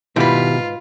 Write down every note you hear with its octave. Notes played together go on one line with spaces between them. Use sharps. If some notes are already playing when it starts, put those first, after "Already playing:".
G#2 B2 D#3 G3 E4 F4 B4